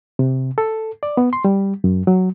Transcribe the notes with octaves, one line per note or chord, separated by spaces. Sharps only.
C3
A4
D5
B3
C6
G3
F#2
F#3